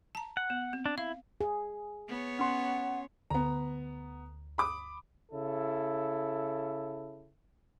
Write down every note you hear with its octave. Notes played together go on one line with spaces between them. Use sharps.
A5 A#5
F#5
B3
C4
D4
E4 F5
G#4
B3 C#5
C#4 F#5 C6
D2 B3 A#5
B5 D6 D#6
C#3 E4 A4